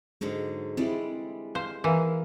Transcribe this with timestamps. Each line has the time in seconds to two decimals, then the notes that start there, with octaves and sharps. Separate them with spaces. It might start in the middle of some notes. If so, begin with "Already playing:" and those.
0.21 G#2 D3 F#3 G#3
0.77 G3 G#3 C4 E4 D5
1.55 C5 F5
1.84 E3 A#4 F5